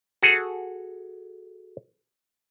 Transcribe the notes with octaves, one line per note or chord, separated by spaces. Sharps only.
F#4 G#4 A4